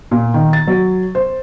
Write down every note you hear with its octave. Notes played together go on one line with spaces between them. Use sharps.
A#2
D#3
A6
F#3
C5